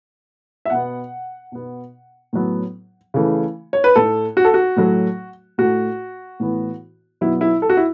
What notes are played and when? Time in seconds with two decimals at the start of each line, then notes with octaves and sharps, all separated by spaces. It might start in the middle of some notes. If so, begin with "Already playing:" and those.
0.65 E5
0.70 B2 B3 F#5
1.52 B2 B3
2.33 A2 F#3 B3
3.14 C#3 E3 A3
3.73 C#5
3.84 B4
3.96 A2 A3 A4
4.37 F#4
4.45 A4
4.54 F#4
4.76 A2 F#3 A3
5.58 A2 A3 F#4
6.40 A2 E3 B3
7.21 B2 F#3 B3 E4
7.41 E4
7.62 A4
7.70 F#4
7.77 E4